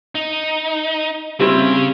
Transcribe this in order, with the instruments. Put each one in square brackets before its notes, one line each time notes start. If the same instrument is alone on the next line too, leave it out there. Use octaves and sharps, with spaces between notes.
[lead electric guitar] D#4
[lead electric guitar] C#3 C#5 [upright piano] G3 C4 E4